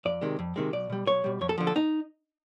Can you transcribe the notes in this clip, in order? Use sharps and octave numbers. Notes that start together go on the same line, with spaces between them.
F2 D5
C3 D#3 G#3
F2
C3 D#3 G#3
B1 D5
B2 G3
B1 C#5
B2 G3
F2 C#5
A4
D3 F3
A4
D#4